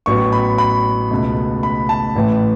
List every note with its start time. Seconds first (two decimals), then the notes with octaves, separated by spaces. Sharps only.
0.06 A1 A2 F#3 B3 C#6
0.33 B5
0.58 B5
1.11 C#2 B2 A3
1.63 B5
1.89 A5
2.16 A1 A2 E3 A3